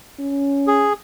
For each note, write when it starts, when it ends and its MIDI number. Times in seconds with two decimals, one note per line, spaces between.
0.19 0.90 61
0.67 0.93 68